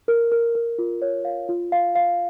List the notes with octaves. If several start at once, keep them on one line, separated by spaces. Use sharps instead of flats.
A#4
A#4
A#4
F4
C#5
F5
F4
F5
F5